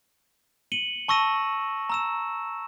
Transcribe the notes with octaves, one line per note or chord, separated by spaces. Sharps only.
C#7 D#7 F#7 G7
A5 C#6 E6 A#6 D#7 E7
A#5 E6 E7